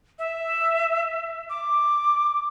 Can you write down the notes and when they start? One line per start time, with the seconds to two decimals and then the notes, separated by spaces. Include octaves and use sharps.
0.19 E5
1.50 D6